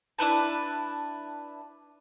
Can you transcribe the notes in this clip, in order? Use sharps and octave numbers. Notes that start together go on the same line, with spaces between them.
D4 E4 B4 A5